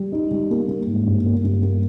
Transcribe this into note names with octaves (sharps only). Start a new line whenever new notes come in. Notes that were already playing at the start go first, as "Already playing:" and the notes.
Already playing: G3
D#4
G3
A#3
A#3
G#2
G2
A#3
G2
A#3